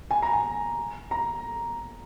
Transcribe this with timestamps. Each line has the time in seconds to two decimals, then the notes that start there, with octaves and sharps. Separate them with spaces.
0.11 G#5
0.22 A#5
0.33 G#5
1.11 A#5